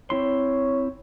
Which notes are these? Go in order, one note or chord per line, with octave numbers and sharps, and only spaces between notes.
C4 E4 C#5 C6